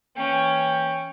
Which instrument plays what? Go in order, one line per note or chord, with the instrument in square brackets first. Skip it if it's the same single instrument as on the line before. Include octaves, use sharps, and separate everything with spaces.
[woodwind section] E3 A#3 G5 [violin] C#4